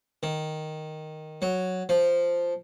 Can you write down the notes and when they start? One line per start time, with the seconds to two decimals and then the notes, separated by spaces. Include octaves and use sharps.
0.23 D#3
1.42 F#3
1.89 F3